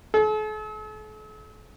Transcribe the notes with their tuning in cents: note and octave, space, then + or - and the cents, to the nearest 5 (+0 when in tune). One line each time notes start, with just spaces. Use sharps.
A4 -45